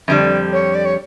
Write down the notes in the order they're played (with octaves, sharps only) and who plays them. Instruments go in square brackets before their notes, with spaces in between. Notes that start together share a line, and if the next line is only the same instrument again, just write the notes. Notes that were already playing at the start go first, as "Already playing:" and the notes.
[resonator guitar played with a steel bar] F2 D3 G3 [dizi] D5 E5
[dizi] C#5
D5
C#5